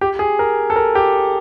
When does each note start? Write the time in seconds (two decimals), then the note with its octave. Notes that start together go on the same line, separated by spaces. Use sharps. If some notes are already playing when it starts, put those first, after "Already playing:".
0.01 G4
0.19 G#4
0.39 A#4
0.70 A4
0.76 A#4
0.95 G4